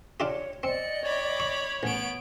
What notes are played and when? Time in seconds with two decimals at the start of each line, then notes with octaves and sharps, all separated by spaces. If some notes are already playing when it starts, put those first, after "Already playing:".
0.20 D4 F4 G4 C#5
0.63 C4 D5 D#5 G5 C#7
1.05 C#5 B5 D6
1.40 C#6
1.83 A1 B3 D7